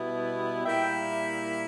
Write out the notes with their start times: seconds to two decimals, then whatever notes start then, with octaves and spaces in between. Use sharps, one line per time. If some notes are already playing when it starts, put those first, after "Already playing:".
Already playing: B2 G3 B3 E4
0.64 A#2 G3 A#3 E4 E5 G5